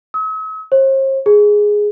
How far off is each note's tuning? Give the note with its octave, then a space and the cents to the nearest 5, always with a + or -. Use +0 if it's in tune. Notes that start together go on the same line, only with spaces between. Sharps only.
E6 -45
C5 +45
G#4 +0